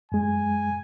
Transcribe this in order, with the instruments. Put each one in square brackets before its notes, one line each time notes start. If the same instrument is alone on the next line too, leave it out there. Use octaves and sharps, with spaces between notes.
[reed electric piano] F#2 G#3 [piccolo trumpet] G#5